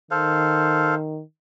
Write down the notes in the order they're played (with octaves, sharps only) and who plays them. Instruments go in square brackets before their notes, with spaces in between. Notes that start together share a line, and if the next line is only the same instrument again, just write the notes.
[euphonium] D#3 [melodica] A4 C5 F5